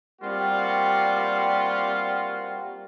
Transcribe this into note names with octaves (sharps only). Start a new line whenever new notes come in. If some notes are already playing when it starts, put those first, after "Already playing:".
G3 A#3 C4 F4 F#4